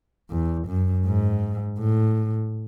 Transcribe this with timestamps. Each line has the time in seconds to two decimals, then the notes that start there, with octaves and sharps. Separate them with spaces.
0.31 E2
0.68 F#2
1.06 G#2
1.79 A2